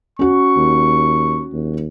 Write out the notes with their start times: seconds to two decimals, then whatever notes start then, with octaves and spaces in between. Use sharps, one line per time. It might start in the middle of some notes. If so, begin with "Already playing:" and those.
0.19 C#4 F#4 C#6
0.56 D#2
1.53 D#2